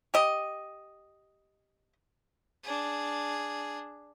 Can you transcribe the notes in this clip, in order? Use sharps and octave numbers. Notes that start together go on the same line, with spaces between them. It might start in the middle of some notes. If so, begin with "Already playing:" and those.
G4 D#5
D4 G#4